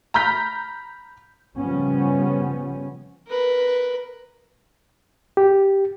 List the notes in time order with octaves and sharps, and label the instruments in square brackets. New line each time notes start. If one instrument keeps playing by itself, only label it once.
[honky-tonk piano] A#5 B5 F6 G6 B6
[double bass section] C#3 F3 G3 B3 C#4
[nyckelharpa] A#4 B4
[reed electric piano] G4